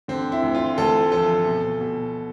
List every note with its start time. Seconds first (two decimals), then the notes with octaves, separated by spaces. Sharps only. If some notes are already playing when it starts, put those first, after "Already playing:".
0.08 D3 C4
0.32 E4
0.43 D2
0.55 F4
0.78 D2 A4
1.12 F3 A4
1.46 B2
1.81 B2